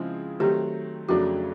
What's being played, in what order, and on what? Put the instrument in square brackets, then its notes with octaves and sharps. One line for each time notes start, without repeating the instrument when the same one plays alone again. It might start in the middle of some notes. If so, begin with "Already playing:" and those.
Already playing: [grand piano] C#3 F3 G#3 C4 E4
[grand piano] D#3 F#3 A3 C4 [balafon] G4
[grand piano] F2 C#3 F#3 A3 D4 [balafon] F#4